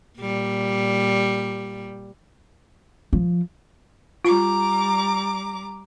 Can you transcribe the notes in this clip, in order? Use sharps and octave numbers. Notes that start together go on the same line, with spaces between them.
A#2 G3
F3
G3 F4 A#5 D6